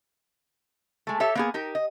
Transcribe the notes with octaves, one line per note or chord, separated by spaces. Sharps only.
G#3 A3
G4 A4 C#5 E5
A#3 B3 G#4
D#4 G4 A#4
D#5